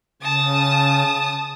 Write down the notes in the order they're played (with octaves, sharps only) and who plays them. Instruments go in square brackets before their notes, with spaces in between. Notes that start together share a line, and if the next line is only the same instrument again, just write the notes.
[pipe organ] C#3 [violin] A5 D#6